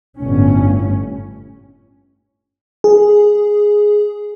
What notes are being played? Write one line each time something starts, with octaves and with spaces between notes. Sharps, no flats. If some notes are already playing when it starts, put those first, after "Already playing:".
G1 A2 C#4
G#4